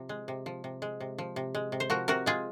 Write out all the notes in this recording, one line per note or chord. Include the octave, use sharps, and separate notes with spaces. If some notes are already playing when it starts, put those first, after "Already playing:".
Already playing: C3 F3
G#3
C3
F3
C3
G#3
C3
F3
C3
G#3
C3
C5
F3 F#4 A#4
C3 F#4 A#4
G#3 F4 G#4